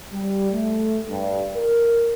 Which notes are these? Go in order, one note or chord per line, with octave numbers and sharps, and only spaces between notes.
G3
A3
G2
A#4